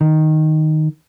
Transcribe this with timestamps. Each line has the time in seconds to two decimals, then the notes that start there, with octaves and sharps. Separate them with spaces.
0.01 D#3